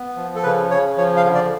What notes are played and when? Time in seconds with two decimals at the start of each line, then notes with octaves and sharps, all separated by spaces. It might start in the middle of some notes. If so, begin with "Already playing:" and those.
Already playing: B3
0.16 F3
0.35 A4
0.43 C#3 B4
0.71 C#3 C#5
0.97 F3 C#5
1.17 F5
1.25 D3
1.35 D5